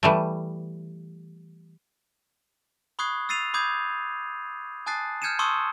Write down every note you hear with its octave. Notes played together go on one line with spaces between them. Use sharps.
E3 G3 A3
B5 C#6 D#6 F#6 G#6 C7
E6 A6 C7 D#7 F7
B5 D6 D#6 G6 G#6
G#5 A5 D#6 F#6 A6 C7
F6 G6 G#6 C#7 D#7 E7
A5 C6 C#6 D#6 E6